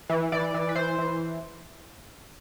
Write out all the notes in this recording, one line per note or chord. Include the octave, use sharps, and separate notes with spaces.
E3
E3 D5
E3
B4
E3 C5
E3